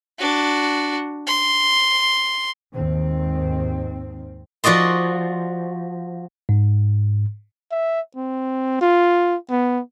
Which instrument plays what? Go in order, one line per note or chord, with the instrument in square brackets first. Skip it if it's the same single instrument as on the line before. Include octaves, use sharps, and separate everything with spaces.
[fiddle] D4 F#4
C6
[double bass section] D#2 G#2 D#3 C4
[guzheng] F3 F#4 D5 D#5 C6
[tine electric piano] G#2
[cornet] E5
C4
F4
B3